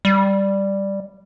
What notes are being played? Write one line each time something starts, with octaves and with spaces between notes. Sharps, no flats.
G3